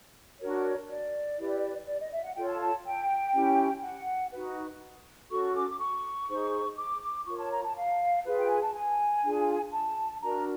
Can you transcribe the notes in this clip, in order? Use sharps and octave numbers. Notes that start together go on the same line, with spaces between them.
D4 F#4 A#4 C#5
D5
E4 G4 B4
D5
D#5
E5
F#5
F4 A4 C#5 G5
A5
A5
G5
C#4 E4 G4
F#5
D#4 F#4 B4
C#4 F#4 A4 C#6
D6
D6
C#6
D#4 G#4 C5
D6
D6
F4 A#4 C#5 C#6
A5
A#5
A5
F5
F4 G#4 B4
G5
G#5
A5
G#5
D4 F4 G#4
A5
D4 F#4 A#4 A#5